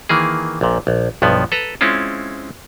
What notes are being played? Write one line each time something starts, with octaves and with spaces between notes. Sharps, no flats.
D#3 E3 A#3 G#4
A#1 A#2
A#1
B1 G2 F3 B3
A4 B4 A#5
G#3 C4 C#4 E4 F4